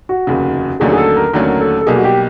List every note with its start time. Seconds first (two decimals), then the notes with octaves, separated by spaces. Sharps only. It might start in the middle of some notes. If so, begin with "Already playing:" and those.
0.09 F#4
0.27 F1 D#2 C#3
0.80 D#2 D3 F#3 A3 C#4 G#4
0.92 G#4
0.98 A4
1.16 A#4
1.33 D#2 D3 F#3 A3 C#4 A#4
1.61 A4
1.81 A4
1.87 B1 B2 G3 A#3 G#4
1.97 F#4
2.04 G4